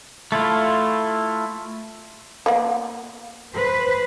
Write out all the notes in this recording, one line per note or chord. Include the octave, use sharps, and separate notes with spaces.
A3 E4 F4
A#3 B3 F#5
B4 C5